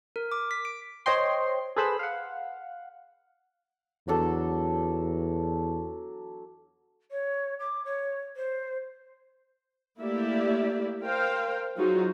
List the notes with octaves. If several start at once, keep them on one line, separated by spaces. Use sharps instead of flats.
A#4
D6
B6
D7
C5 C#5 D#5 G5 C6
G#4 A4 B4 C5 B5 E6
F5 F#5
E2 F#3 D4 A4
C#5
D6
C#5
C5
A3 A#3 E4 G4 D5 E5
A#4 C5 F5 G5
F#3 D#4 F4 F#4 G#4 C5